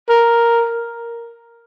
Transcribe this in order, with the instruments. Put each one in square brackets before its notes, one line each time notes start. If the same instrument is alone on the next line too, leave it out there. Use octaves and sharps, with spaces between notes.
[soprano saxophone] A#4